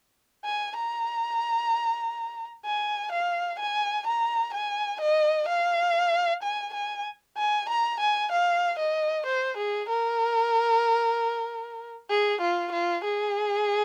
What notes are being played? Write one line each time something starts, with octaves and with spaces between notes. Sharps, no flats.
G#5
A#5
G#5
F5
G#5
A#5
G#5
D#5
F5
G#5
G#5
G#5
A#5
G#5
F5
D#5
C5
G#4
A#4
G#4
F4
F4
G#4